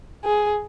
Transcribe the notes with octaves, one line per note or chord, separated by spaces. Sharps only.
G#4